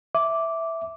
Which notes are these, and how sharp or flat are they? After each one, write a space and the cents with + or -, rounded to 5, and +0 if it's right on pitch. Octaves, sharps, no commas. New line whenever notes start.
E5 -5 D6 -5